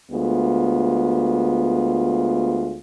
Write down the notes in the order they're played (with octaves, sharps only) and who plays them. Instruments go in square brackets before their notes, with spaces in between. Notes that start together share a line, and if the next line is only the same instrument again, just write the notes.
[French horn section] D2 G#3 B3 F4